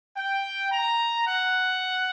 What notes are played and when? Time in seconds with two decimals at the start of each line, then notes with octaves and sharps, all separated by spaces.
0.17 G5
0.72 A#5
1.27 F#5